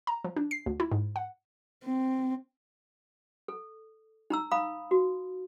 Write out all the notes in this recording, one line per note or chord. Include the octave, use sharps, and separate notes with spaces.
A#5
F3
D4
C7
D2
E4
G#2
F#5
C4
A4
D#4 A#5 E6
F5 B5 D#6
F#4